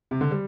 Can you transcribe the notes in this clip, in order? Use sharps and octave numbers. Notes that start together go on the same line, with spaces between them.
C3
D3
G3